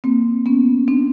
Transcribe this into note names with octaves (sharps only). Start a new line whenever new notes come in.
A#3 C4
B3 C#4
C4 D4